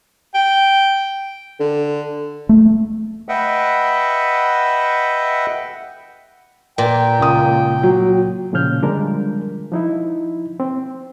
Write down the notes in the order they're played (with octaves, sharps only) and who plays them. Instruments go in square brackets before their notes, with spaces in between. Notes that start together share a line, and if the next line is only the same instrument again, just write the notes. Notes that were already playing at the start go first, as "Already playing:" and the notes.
[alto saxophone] G5
[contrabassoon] D3
[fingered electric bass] A3
[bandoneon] B4 D#5 E5 F#5 G5
[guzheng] A#2 [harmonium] G5
[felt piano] C#2 D#6
F#3
[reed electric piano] A#2 C#3 F3 C#4 F6 G6
D3 F3 G3 G#3 D4 A#4
F3 D#4 E4
C4